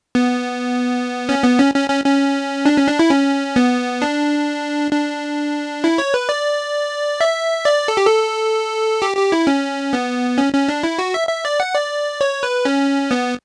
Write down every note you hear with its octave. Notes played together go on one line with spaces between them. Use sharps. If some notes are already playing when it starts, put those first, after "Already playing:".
B3
C#4
B3
C#4
C#4
C#4
C#4
D4
C#4
D4
E4
C#4
B3
D4
D4
E4
C#5
B4
D5
E5
D5
A4
G4
A4
G4
G4
E4
C#4
B3
C#4
C#4
D4
E4
F#4
E5
E5
D5
F#5
D5
C#5
B4
C#4
B3